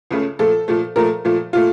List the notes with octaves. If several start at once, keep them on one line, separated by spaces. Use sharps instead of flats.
C#2 C#3 A3
A#2 F3 A3 A4
A#2 F3 A3
A#2 F3 A3 A#4
A#2 F3 A3
A#2 A3 F4